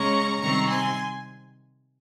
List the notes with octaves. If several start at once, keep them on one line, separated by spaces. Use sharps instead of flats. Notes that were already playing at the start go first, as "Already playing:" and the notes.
Already playing: C#3 G#3 C#4 A#5 C#6
C3 D#3 G3 C4 A#5 C#6
G#5 C6